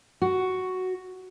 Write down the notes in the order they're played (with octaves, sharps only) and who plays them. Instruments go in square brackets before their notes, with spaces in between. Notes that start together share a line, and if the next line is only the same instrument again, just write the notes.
[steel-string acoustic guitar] F#4